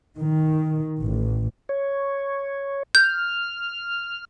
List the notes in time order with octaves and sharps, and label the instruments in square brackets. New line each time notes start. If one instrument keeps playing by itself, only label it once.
[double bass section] D#3
A1
[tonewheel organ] C#5
[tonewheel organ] F6 [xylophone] G6